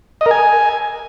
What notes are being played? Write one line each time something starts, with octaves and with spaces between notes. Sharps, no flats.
D#5
A#4
G#5